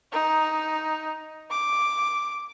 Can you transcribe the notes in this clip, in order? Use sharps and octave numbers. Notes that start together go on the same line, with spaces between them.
D#4
D6